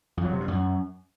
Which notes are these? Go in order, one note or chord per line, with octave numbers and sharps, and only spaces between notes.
F2
F#3
C3
G2
F#2